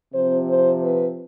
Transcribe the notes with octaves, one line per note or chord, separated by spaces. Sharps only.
C3 F3 C4 C5
C5
B4